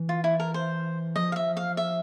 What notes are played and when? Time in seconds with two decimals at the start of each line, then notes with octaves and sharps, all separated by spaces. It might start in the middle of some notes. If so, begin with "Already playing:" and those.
Already playing: E3
0.09 F4
0.24 E4
0.40 A#4
0.54 C5
1.16 F3 D#5
1.32 F5
1.36 E5
1.57 F5
1.77 E5